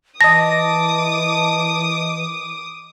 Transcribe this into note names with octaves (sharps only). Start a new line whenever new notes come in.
E3 D#5 A5 D6 D#6 A#6